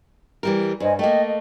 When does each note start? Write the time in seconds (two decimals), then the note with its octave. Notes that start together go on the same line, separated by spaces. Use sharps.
0.43 E3 G3 A#4
0.80 G2 C5 D#5 G#5
0.99 A3 A#3 D#5 G5
1.25 D#5